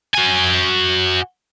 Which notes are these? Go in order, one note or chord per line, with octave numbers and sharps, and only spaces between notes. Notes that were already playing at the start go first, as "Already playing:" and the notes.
F#4 G#5